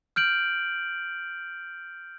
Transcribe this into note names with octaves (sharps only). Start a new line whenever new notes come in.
F6 G6 D7 F#7